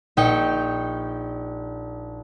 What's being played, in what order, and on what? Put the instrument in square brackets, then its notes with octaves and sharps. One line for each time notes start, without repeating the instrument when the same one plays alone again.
[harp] A#1 D#4 G5 C#7